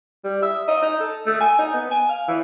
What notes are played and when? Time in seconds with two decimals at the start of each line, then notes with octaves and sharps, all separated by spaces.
0.24 G3
0.43 E5
0.68 D#5
0.82 D#4
1.00 A4
1.27 A3
1.41 G#5
1.59 D#4
1.74 B3
1.91 G#5
2.09 F5
2.28 E3